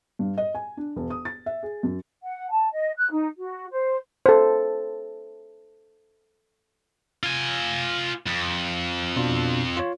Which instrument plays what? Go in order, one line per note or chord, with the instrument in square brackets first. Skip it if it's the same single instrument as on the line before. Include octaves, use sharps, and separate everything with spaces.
[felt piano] G2
D#5
G#5
D4
E1
D#6
A6
E5
G#4
F#2
[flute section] F#5
A5
D#5
F#6
D#4
F#4
C5
[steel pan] A4 C5
[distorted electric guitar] F4 G#5
F2
[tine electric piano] B2 D4 F4
F4 C#5